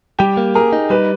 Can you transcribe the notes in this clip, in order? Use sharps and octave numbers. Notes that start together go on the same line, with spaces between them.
G3 G4
A#3
G#4 A#4
D#4
G3 B4